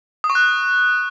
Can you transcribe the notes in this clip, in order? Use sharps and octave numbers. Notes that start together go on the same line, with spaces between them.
D#6
C#6
F#6